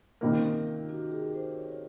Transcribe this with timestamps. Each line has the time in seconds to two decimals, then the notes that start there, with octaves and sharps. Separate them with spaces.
0.21 C3 D#3 A#3 C#4
0.44 D#4
0.67 F4
0.90 F#4
1.11 G#4
1.34 C5
1.58 C#5